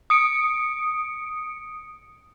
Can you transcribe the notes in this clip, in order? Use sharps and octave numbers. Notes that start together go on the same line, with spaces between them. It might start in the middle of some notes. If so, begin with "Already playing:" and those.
D#6 C#7 D7